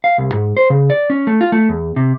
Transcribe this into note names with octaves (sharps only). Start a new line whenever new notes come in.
F5
C2
G#2
C5
C#3
D5
C#4
A3
F4
A3
E2
C3